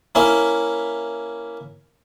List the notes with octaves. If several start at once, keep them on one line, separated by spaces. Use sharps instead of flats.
A#3 C#4 E4 E5